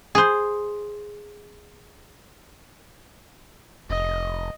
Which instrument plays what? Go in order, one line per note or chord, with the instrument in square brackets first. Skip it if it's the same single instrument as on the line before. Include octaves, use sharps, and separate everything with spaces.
[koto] G#4 C5
[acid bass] F1 [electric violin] D#5